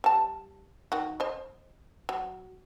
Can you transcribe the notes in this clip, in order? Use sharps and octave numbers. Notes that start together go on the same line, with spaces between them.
G3 A5
D#3 F#4
C5 D#5
F#3